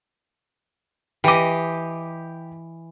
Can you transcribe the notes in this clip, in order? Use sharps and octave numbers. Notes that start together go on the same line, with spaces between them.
E3 G4 D#5 D6